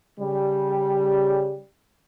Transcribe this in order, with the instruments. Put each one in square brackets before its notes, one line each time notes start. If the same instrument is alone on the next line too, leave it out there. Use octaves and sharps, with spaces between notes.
[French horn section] C#3 G3